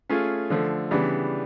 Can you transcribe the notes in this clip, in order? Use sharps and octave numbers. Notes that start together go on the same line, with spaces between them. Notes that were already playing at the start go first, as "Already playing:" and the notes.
A3 C#4 F4 G#4
D3 F3 A3
C#3 E3 G3 B3 D4